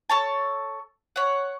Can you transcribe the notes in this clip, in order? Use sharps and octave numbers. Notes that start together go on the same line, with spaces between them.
A4 C#5 A5
C#5 F#5